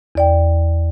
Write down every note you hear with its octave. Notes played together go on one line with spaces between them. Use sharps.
E2 D5 G5